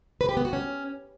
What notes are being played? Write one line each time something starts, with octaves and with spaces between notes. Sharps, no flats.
B4
G4
B3
F#4
C#4